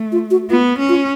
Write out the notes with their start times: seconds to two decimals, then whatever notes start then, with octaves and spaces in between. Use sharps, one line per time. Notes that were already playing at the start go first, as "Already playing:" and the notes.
Already playing: A3
0.12 F4
0.31 F#4
0.50 B3 F4
0.79 C#4
0.89 F4